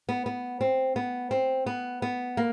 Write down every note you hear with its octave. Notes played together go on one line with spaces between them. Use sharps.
B3
B3
C4
B3
C4
B3
B3
A#3